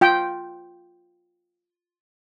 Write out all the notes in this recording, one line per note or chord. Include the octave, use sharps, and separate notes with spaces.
F4 G5